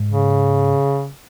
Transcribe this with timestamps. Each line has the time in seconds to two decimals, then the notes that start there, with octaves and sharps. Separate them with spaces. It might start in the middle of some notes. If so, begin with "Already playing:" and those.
Already playing: G#2
0.08 C#3